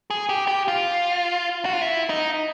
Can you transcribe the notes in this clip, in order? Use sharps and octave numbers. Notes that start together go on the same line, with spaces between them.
G#4
G4
G4
F4
F#4
F4
E4
D#4